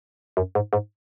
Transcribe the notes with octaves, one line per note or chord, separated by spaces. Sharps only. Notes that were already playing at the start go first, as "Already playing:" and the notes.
F#2
G#2
G#2